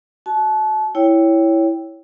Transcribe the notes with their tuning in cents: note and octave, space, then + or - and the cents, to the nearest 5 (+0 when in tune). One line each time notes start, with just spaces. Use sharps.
F#4 +0 A5 -30
E4 +0 C#5 +5 G5 +0